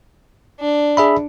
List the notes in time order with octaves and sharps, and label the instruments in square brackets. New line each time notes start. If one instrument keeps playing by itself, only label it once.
[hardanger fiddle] D4
[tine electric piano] G#4 E5 B5